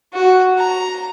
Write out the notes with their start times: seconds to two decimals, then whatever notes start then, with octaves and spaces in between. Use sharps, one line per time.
0.14 F#4
0.58 A#5